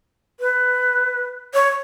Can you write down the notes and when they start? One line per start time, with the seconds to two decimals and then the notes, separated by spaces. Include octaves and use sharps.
0.40 B4
1.54 C#5